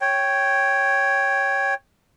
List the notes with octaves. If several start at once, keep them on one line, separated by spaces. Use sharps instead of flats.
C#5 G5